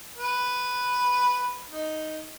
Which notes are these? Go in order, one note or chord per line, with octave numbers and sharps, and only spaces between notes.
B4
D#4